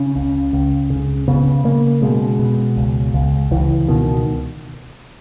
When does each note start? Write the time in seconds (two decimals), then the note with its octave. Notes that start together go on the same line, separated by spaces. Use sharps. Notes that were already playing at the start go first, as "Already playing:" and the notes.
Already playing: C#3 C#4
0.16 C#2
0.53 C#2
0.90 C#3
1.28 C#3 B3
1.64 C#3 A#3
2.02 B2 G#3
2.39 B2
2.77 C#2
3.14 C#2
3.51 C#2 E3
3.88 B2 D#3